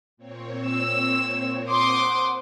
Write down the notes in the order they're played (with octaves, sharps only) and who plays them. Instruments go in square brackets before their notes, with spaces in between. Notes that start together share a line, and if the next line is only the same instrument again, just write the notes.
[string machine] A#2 C4 C#5
[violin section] E6
[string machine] C5 F#5 [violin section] C6 D6 D#6